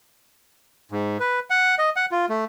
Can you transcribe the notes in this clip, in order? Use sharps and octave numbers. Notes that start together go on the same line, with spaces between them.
G#2
B4
F#5
D#5
F#5
F4
A3